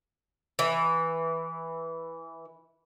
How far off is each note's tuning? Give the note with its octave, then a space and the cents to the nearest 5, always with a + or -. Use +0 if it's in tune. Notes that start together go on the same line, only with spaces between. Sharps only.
E3 -5